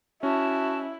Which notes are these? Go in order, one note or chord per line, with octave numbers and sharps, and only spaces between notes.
C#4 E4 F#4 A5